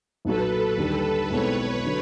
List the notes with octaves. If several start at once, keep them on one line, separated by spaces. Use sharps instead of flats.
B1 A#2 F#3 A4 B4
D#2 D3 G3
B1 B2 G#3 C4 E4 B4 C#5
D3 F#3